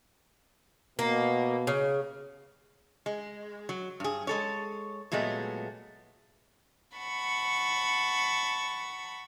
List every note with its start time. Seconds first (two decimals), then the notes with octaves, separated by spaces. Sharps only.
0.99 B2 A#3
1.67 C#3
3.06 G#3
3.69 F#3
4.00 G2 G#4
4.27 G#3 A4 C#5
5.12 A#2 F#3 G#3 A3 B3
6.96 F#5 A5 B5 C#6